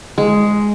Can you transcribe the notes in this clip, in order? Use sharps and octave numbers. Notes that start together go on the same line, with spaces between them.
G#3